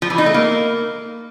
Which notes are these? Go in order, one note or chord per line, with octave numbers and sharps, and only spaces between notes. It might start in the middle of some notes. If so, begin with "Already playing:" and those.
F3
E3
D#4
A3
A#3